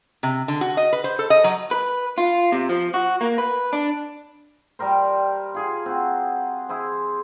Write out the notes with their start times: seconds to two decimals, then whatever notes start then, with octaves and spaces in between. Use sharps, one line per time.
0.23 C3
0.48 D3
0.61 F#4
0.77 D#5
0.93 B4
1.04 C5
1.19 A4
1.30 D#5
1.44 F#3
1.71 B4
2.18 F4
2.52 C3
2.69 F3
2.94 F#4
3.21 A#3
3.38 B4
3.73 D4
4.79 G3 G4 A#4 C5
5.54 F4 G#4 G#5
5.86 C4 F#4
6.69 E4 G#4 C5